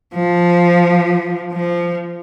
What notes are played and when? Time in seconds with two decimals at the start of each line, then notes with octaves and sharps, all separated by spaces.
0.14 F3
1.53 F3